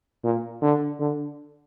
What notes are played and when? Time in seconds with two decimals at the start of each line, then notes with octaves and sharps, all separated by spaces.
0.24 A#2
0.62 D3
1.00 D3